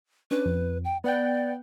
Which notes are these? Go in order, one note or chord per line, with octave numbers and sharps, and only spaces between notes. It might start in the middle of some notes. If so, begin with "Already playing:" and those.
C#4 D4 B4
F2
G5
B3 D5 F#5 G5